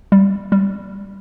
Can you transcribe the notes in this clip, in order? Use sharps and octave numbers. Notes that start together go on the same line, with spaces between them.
G3
G3